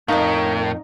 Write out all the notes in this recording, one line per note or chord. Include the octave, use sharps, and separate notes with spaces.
F2 A2 D#4 A#4 F5